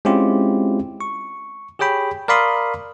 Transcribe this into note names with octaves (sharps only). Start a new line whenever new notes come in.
G#3 C4 C#4 E4 F4 G4
C#6
G4 G#4 C#5 G5 B5
A#4 D5 F5 B5 C6 D#6